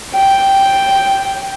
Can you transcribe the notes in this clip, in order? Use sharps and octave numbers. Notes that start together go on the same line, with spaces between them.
G5